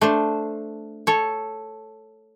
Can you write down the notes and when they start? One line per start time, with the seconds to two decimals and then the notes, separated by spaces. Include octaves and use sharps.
0.01 A3 D4 C5
1.07 A4 C#5